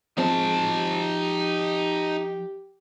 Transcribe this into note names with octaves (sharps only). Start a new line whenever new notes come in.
F3 G#3 C4 D#4 A5
G4